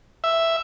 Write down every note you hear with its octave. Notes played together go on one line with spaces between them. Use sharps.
E5